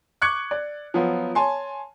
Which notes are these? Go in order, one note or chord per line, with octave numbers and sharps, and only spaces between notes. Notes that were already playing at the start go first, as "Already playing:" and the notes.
C#6 D6 F#6 G#6 C#7
D5
F3 F#3 B3 F4
C#5 G#5 A5 C6